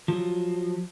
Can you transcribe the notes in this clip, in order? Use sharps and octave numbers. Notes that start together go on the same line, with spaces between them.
F3 F#3